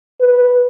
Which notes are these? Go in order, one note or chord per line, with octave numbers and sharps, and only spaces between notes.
B4